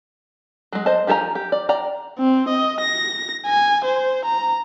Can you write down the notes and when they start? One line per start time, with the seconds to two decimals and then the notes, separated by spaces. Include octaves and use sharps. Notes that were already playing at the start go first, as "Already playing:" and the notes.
0.73 F#3 G#3
0.86 C5 D#5 A5
1.07 F3 G4 A4 G#5 A#5
1.35 G4
1.52 D5
1.69 D5 G5 A#5
2.19 C4
2.48 D#5
2.80 A#6
3.46 G#5
3.84 C5
4.25 A#5